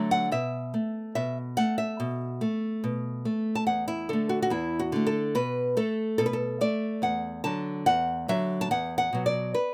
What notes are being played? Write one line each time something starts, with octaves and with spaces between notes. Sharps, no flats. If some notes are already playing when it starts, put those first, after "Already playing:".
Already playing: D3 F#3 A3
F#5
B2 E5
A3
B2 E5
A3 F#5
E5
B2
A3
B2
A3
A5
E2 F#5
E4
D3 A3 A4
F#4
F#4
E2 E4
F#4
D3 A3
A4
B2 B4
A3 A4
B2 A4
B4
A4
A3 D5
E2 F#5
D3 F#3 A5
E2 F#5
D3 F#3 E5
A5
E2 F#5
F#5
B2 F#3
D5
B4